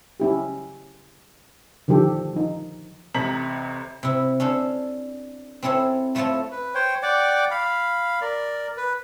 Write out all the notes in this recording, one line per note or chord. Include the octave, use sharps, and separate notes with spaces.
C#4 E4 G4
D3 D#3 F3 G4 A4
F3 D#4
A1 C3 A#5 B6 F#7
C3 E4
C#4 D4 A4 C5
C4 C#4 E4 A4 C#5
F3 A3 E4 F4 C#5 A5
B4
C5 C#5 G5
D5 F#5 G5 D6
F5 B5
A#4 D5
B4